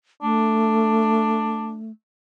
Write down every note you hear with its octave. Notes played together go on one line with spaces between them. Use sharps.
A3 D4